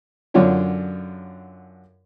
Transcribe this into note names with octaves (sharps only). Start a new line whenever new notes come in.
F#2 D3 D4 F4 C#5